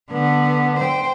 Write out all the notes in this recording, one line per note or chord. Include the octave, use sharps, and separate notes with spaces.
D3 B3
C5 G5